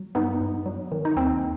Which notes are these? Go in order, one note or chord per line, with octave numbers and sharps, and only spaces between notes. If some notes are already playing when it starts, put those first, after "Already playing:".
Already playing: F#3
G2 B3 D#4
G2
F#3
D#3
D#4
D#2 C4